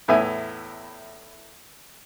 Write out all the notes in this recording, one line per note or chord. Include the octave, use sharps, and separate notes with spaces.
E2 A2 B3 E4 E5 G#5